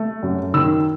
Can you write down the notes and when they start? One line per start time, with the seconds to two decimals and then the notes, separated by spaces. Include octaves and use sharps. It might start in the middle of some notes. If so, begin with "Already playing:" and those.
Already playing: A3
0.23 F#2
0.54 D#3 E6